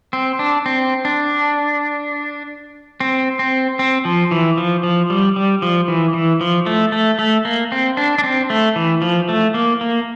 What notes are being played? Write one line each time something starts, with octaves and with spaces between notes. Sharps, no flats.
C4
D4
C4
D4
C4
C4
C4
F3
E3
F3
F3
G3
G3
F3
E3
E3
F3
A3
A3
A3
A#3
C4
D4
D4
C4
A3
E3
F3
A3
A#3
A#3